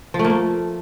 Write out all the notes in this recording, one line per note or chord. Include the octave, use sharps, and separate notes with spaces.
F3
A3
A#3
A3